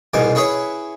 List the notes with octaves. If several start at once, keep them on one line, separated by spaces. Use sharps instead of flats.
C2 G#2 B2 G#5 D6
C#4 E4 G#4 B4 C#5